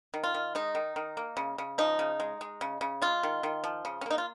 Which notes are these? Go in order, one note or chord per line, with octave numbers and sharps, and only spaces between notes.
D#3
F4
D#3
G#3 D#4
D#3
D#3
A#3
C#3
C#3
F3 D#4
C#3
G#3
G#3
C#3
C#3
G#3 F4
D#3
D#3
F3
C#3
C#4
A#3 D#4
F4